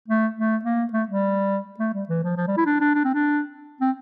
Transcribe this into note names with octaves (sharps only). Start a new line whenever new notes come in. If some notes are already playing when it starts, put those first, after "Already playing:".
A3
A3
A#3
A3
G3
A3
G3
E3
F3
F3
G3
E4
D4
D4
D4
C4
D4
C4